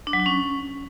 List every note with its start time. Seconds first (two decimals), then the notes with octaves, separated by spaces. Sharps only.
0.07 D4
0.13 F#3
0.20 D4
0.26 C#4